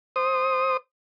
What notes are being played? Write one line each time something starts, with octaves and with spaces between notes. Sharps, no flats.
C5 D#6